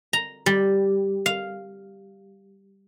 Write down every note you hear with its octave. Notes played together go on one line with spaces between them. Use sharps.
A#5
G3
F5